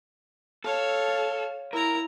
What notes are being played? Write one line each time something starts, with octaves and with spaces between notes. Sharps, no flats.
A4 C#5 F5
E4 A#4 A#5